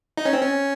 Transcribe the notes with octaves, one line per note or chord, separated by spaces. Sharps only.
D#4
C#4
C4
C#4